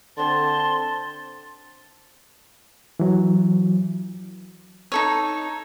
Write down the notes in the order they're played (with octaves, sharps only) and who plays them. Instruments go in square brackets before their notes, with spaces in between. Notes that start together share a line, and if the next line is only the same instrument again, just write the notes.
[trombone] D3 [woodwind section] C4 C5 A5 [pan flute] C6
[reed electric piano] E3 F#3
[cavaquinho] D#4 A4 C#5